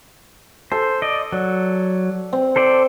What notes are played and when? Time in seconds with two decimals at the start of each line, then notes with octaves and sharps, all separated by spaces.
0.72 A4 C5
1.02 D5 D#5
1.32 F#3 D5
2.33 C4
2.56 A4 C5 D5